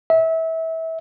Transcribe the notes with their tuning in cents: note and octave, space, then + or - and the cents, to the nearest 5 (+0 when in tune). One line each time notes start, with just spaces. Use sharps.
E5 -25